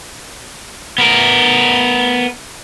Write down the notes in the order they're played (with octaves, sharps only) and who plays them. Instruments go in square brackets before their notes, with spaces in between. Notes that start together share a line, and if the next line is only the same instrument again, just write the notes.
[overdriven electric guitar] B3 A#4